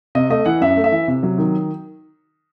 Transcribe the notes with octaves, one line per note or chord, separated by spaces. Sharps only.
C3 D#5
A3 D#5
E3 F#5
F#2 E5
A3
E5
E3
C3
F#3
D#3